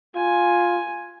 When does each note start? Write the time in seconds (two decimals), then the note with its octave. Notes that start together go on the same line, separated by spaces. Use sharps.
0.16 F4 G#5